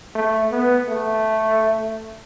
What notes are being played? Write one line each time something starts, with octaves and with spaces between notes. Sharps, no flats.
A3
B3
A3